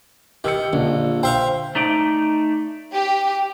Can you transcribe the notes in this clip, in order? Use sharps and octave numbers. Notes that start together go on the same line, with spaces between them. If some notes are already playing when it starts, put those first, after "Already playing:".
D#3 G4 E6 C#7
A#1 D3
C5 E5 F5 G5
A3 D#4 D5
G4